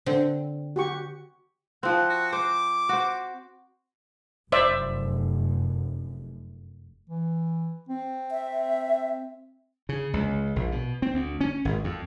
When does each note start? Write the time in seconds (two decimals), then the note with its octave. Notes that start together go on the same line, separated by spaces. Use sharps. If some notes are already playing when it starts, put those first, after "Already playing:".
0.06 D3 C4
0.76 F#4 G4 C#6
1.83 F3 C4 F#5
2.09 F#4
2.33 C5 D6
2.89 F#4 C5
4.52 F1 F#2 C5 D5 E5
7.10 E3
7.89 C4
8.31 E5
9.89 C#3
10.13 C#2
10.56 A#1
10.72 B2
11.02 C4
11.14 D2
11.41 C#4
11.65 G#1
11.84 F2